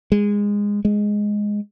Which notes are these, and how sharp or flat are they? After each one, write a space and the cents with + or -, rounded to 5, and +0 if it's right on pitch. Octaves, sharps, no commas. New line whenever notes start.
G#3 -20
G#3 +0